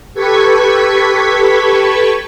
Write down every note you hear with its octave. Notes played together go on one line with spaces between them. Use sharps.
G4 A4 B4 C#6 G#6 B6